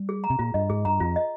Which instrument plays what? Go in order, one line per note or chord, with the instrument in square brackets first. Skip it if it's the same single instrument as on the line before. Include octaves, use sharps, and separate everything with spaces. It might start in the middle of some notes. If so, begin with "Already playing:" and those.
Already playing: [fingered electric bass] G3
[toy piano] G#4
A#5
[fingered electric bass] C3
[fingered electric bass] A#2 [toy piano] F4
[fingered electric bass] G2 [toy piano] D#5
[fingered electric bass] G#2 [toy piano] G#4
[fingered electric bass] G2 [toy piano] A#5
[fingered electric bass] F2 [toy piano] F4
[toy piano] D#5